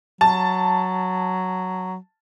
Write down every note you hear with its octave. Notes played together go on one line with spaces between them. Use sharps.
F#3 A5